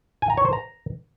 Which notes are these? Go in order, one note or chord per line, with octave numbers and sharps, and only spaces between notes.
G#5
A#5
C#5
C5
A#5